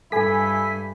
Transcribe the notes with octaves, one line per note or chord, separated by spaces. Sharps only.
G2 E4 A4 G#5 B6